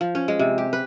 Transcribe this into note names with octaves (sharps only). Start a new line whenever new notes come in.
F3
C#4
G#3
C3
G4
B4